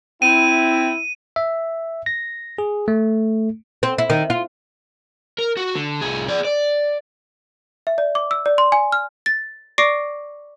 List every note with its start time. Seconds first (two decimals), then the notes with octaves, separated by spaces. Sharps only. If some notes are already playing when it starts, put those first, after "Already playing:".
0.22 C4 E4 D#7
1.36 E5
2.06 A#6
2.58 G#4
2.88 A3
3.83 C4
3.98 E4
4.10 D#3
4.30 F4
5.38 A#4
5.57 F#4
5.75 D3
6.01 C2 G#4
6.28 G#4 D5
6.45 D5
7.87 E5
7.98 D5
8.15 D6
8.31 E6
8.46 D5
8.58 C6
8.72 G#5
8.92 F6
9.26 A6
9.78 D5 C#6 D6 A#6 C7 D7